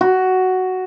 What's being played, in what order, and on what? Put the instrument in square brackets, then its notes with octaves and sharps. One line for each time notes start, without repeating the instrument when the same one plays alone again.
[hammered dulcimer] F#4